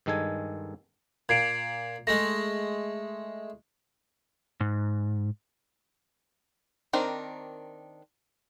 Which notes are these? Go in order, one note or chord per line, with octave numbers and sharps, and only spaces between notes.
G2 D#3 G#3 A4 G#5
A#2 G#6 C7 D7
G#3 A3 A#6
G#2
D#3 C4 D4 A#4